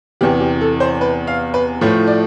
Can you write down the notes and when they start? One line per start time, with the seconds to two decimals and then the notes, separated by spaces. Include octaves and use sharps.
0.21 E2 C3 E3 G4
0.40 G4
0.61 A4
0.80 C5
1.01 B4
1.27 F5
1.54 B4
1.81 A2 F3 A3 C#5
2.08 D5